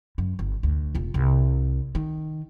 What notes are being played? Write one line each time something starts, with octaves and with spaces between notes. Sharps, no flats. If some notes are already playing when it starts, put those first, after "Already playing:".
F#2
G1
D2
E1 F4
C2
D#3